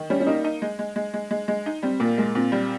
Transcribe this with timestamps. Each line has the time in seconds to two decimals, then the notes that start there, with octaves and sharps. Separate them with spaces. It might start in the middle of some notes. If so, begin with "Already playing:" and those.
Already playing: D#3
0.10 G3 C#4
0.20 C#4
0.27 A#3 D#4
0.44 D#4
0.62 G#3
0.79 G#3
0.96 G#3
1.14 G#3
1.31 G#3
1.48 G#3
1.66 D#4
1.83 G3 C4
2.00 A#2 A#3
2.18 G#3 A#3
2.35 A#2 C4
2.52 G3